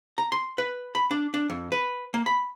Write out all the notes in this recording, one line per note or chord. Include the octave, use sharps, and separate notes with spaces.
A#5
C6
B4
B5
D4
D4
F2
B4
A#3
B5